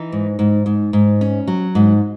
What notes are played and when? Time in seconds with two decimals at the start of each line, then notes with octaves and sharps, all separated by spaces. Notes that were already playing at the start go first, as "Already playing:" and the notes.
Already playing: E3 D#4
0.12 G#2
0.39 G#2
0.66 G#2
0.93 G#2
1.21 C#4
1.48 F#3
1.75 G#2